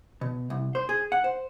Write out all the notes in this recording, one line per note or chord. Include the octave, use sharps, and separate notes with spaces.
B2
C2
C5
G#4
F#5
C5